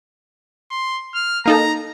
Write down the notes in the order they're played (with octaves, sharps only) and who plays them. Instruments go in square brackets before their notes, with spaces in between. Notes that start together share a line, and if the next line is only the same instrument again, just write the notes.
[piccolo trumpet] C6
F6
[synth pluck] A#3 D#4 A4 [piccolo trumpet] A#5